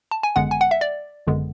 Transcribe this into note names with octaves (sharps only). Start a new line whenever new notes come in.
A5
G#5
G#1 F#2 D3 G#3 B3 F#5
G#5
F#5
E5
D5
G#1 F#2 D3 G#3 B3